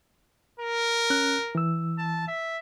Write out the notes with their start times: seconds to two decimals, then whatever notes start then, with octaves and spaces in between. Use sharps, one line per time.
0.60 A#4
1.10 C#4 F#6
1.55 E3 E6
1.98 A5
2.28 E5